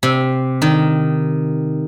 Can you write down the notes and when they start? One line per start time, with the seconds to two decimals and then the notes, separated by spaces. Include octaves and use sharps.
0.03 C3
0.62 D#3